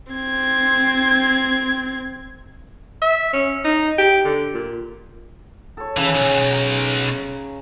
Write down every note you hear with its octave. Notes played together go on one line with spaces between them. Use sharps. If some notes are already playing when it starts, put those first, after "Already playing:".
C4 G#6
E5
C#4
D#4
G4
D3
A#2
A4 C#5
C#3 E3 G#5
B1
A#5